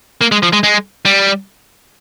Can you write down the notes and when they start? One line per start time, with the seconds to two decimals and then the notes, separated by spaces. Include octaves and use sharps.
0.21 A#3
0.32 G#3
0.43 F3
0.53 G#3
0.63 G#3
1.05 G3